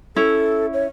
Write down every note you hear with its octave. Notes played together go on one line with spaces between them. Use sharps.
C#4 E4 A4
C#5